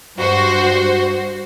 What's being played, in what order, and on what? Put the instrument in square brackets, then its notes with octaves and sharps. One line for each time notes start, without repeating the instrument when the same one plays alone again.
[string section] G2 F#4 C5